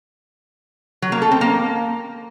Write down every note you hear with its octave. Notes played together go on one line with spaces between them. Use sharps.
F#3
A#3
A4
C4
A#3